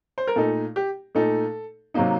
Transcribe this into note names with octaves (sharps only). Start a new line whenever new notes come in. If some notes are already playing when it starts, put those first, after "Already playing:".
C5
A#4
A#2 A3 D#4 A4
G4
A#2 A3 D#4 A4
C3 F#3 A#3 D#4